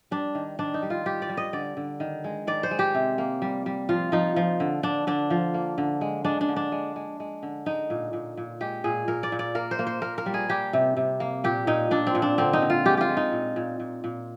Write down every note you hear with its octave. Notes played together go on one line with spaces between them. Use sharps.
G3 D4
D#3
D#3 D4
D#4
G3
F4
G3 G4
D5
G3
D#5
D3 D5
D3
D#3
G#3
D#3 D5
C5
G#3
G4
C3
A#3
G3
G3
F3 F4
F3 D#4
F3
D3
D3 D4
D3 D4
F3
A#3
D3
G#3
G#3 D4
D4
D3
D4
G#3
G#3
G#3
D3
G#3 D#4
A#2
A#2
A#2
G#3 G4
A#2 G#4
A#2 A#4
D5
A#2
D5
A#3 A#4
C5
A#3
C5
A#3 A#4
A#4
G3
G#4
G3 G4
C3
C3
A#3
A#2 G4
A#2 D#4
A#2 D4
C4
A#2
D4
D3 C4
D#4
D3
F4
G#3 G4
F4 G4
G#3
D#4
A#2
A#2
A#2
A#2